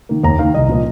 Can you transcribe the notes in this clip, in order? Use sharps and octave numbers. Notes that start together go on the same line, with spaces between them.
D#3 A#3
D#2 A#5
D#3 A#3 F5
C2 D#5
A#2 F3 A#3